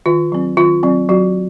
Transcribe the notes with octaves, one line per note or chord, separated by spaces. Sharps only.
D#3 F4
F#3 C4
D#3 F4
F#3 C4
F#3 F#4